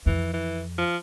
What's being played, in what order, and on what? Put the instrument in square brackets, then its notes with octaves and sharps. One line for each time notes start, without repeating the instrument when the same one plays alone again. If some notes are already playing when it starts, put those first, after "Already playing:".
[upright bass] F2 [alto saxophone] E3
[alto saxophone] E3
F3